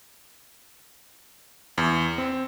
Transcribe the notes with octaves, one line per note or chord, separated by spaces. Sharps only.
E2
C4